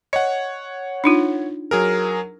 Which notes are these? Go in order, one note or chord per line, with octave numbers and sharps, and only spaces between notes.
C#5 D#5 F#5
D4 D#4 F4
F#3 G#4 A#4